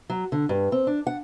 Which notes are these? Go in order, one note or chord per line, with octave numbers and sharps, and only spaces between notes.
F#3
D3
G2
C4
D4
F#5